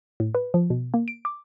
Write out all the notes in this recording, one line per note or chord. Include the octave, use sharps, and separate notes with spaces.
A2
B4
F3
B2
A#3
D7
D6